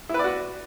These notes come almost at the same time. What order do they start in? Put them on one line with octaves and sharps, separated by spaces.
E4 B4 D5 F#4